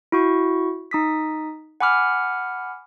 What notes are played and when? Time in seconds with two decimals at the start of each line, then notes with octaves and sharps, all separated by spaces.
0.12 E4 F#4 C#6
0.91 D#4 D#6 B6
1.80 F#5 G#5 B5 D6 F6